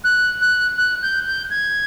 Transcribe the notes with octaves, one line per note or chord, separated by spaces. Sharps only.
F#6
F#6
F#6
G6
G6
G#6